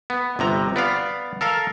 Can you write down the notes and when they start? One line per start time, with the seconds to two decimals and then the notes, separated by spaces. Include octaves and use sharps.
0.10 B3
0.39 G1 C3 A#5
0.76 B3 D5 F5
1.41 A4 A#4 F5